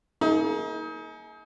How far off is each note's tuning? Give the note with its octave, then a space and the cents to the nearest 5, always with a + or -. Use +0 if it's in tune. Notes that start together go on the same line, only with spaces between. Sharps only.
A#3 +0 D#4 +35 G#4 +30